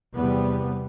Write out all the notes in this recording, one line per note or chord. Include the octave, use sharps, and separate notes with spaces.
E2 C3 G3 B3